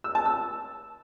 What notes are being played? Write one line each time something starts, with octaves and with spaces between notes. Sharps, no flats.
E6
A5
E6